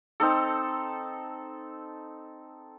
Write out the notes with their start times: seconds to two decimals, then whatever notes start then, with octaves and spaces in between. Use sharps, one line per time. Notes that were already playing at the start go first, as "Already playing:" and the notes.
0.20 C4 D#4 A4